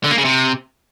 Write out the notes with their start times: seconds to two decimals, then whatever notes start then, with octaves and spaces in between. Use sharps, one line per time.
0.04 D3
0.11 A#3
0.18 C#3
0.25 C3